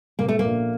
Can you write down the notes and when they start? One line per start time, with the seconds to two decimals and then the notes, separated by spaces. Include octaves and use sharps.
0.19 A#2 A#3
0.28 A3
0.39 A#3
0.45 A#1